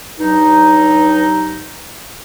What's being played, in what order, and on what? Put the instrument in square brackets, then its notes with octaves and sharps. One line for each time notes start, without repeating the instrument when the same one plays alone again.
[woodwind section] G2 F#3 D#4